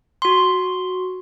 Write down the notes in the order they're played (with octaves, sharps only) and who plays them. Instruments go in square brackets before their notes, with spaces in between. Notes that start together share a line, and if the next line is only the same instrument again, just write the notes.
[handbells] F#4 C6